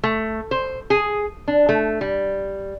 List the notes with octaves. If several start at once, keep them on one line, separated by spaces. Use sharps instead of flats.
A3
C5
G#4
D4
A3
G3